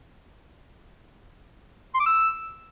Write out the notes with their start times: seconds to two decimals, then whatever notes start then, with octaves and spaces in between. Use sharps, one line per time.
1.94 C6
2.00 D6
2.06 E6